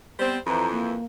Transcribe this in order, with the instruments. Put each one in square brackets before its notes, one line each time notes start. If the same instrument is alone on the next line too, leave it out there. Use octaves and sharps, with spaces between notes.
[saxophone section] G3 C4 C5 [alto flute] B3
[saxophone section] F2 E3 [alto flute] A#5
[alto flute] A#3